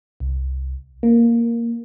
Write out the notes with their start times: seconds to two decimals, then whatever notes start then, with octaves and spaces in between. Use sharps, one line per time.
0.20 C2
1.03 A#3